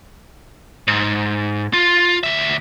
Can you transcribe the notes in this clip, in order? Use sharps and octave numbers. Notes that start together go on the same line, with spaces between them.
G#2
F4
D2 E5